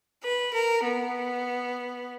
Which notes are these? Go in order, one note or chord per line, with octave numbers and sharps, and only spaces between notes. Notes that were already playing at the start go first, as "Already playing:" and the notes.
B4
A#4
B3